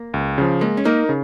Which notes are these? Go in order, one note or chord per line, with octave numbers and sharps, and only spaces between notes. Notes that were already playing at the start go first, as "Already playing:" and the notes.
Already playing: A#3
C#2
C#3 F3
G#3 A#3
C#4
A#3 D#4 A#4
C#3